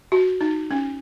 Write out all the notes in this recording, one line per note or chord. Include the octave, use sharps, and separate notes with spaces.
F#4
D#4
C#4